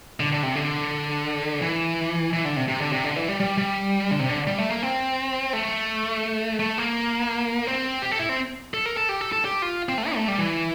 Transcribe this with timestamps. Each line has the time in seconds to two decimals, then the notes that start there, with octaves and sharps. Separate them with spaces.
0.20 D3
0.32 D3
0.43 C3
0.55 D3
1.62 E3
2.33 E3
2.45 D3
2.56 C3
2.68 C3
2.81 D3
2.93 C3
3.04 D3
3.16 E3
3.28 G3
3.40 G3
3.58 G3
4.11 D3
4.20 C3
4.29 D3
4.47 G3
4.58 A3
4.70 A#3
4.83 C4
5.53 A3
6.59 A3
6.78 A#3
7.67 C4
8.02 G4
8.11 A4
8.19 E4
8.29 C4
8.74 A4
8.86 A#4
8.97 A4
9.09 G4
9.21 A4
9.32 A4
9.45 G4
9.62 F4
9.89 C4
9.98 A3
10.07 E4
10.16 A3
10.28 G3
10.39 E3